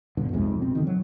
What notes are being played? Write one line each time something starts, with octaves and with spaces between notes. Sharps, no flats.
G1 G2 B2 D3
B1 F2 C3 G#3
B2 C4
D3 D#3
F#3